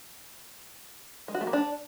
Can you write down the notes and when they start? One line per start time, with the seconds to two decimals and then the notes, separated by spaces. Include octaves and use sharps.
1.28 G#3
1.34 F#4
1.41 A3
1.47 A#3
1.53 D4